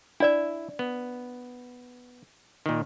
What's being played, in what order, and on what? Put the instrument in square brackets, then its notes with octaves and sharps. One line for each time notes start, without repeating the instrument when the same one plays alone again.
[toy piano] D4 D5 [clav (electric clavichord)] E4 E5
[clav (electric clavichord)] B3
A#2 D#3